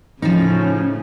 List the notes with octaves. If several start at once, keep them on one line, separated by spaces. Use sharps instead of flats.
A2 C#3 F3 C#4 D#4